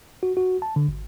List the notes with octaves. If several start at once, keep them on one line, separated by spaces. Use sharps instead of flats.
F#4
F#4
A5
D3
G#1